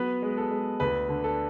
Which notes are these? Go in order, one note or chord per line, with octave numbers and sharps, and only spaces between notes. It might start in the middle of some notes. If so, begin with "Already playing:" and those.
Already playing: F#3 B3 B4
G#3
A4
G#3
D2 B4
D3
A4